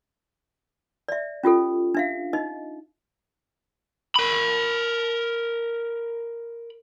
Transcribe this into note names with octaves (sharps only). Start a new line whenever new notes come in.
D5 E5
C#4 F4 G4 A4
D4 E5 F5
D#4 D#5
A#4 B5